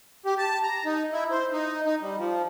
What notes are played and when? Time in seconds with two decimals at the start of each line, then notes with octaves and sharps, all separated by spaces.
0.26 G4
0.38 A5
0.63 A#5
0.85 D#4
1.13 E4
1.31 C5
1.52 D#4
1.85 D#4
2.01 G3
2.17 F3